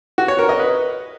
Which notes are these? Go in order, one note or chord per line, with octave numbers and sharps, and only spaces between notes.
F#4
C#5
A#4
D#5
B4